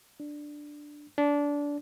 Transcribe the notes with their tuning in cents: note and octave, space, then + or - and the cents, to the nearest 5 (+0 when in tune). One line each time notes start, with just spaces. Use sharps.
D4 +5
D4 -20